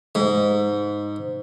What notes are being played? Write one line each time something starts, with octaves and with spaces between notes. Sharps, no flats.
G#2